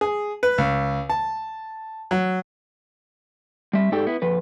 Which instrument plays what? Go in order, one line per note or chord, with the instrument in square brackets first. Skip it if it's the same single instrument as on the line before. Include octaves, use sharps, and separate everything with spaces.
[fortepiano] G#4
B4
C#2
A5
F#3
[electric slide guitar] G3 E5
G#2 D#4 G4 A4 D5 G5
B3 E4
F2 F3 B4